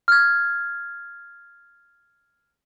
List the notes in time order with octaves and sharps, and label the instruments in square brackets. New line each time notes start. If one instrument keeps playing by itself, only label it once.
[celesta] F6 G#6